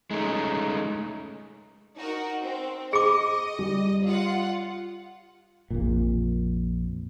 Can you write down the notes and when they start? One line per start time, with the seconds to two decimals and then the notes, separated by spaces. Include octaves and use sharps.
0.11 G#3 A3 C#4 D#4
1.97 D#4 F#4 A#4
2.43 C4
2.93 G#4 D#5 D6 C#7
3.59 G3
4.05 F4 F#5
5.70 A#1 F2 A#2